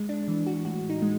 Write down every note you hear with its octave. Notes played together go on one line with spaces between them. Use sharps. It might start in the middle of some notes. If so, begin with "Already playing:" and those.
Already playing: G#3
D4
E3
F#4
A2 F#4
D#4
G#3